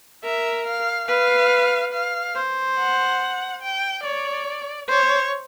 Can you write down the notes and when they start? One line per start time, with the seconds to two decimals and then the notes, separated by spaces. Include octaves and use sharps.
0.23 A#4 E5
0.66 F5
1.08 B4 F5
1.93 F5
2.35 C5
2.78 F#5
3.61 G5
4.03 C#5 D5
4.88 C5 C#5